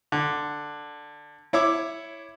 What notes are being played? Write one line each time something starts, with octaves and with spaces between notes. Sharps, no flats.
D3
E4 C#5 E5 D6